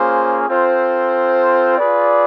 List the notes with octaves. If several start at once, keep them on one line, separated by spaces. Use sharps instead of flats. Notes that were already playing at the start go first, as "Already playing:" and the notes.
Already playing: A#3 C#4 F4 G#4 C5
C4 F4 A4 C5
F4 G#4 B4 D5